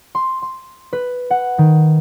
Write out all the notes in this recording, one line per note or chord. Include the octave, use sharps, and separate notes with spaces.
C6
C6
B4
F#5
D#3